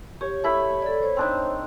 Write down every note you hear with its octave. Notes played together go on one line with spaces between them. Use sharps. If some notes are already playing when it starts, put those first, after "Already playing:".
G4 C#5
A3 E4 B5
A4 D5
C5 C#5
C4 D4 D#4